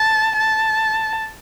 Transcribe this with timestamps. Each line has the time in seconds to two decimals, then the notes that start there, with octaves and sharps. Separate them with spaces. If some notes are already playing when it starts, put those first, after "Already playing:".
Already playing: A5
0.38 A5